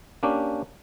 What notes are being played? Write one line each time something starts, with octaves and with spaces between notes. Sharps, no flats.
A#3 C#4 D4 G4